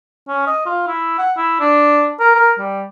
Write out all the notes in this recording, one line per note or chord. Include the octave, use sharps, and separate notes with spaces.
C#4
D#5
F4
E4
F#5
E4
D4
A#4
A#4
G3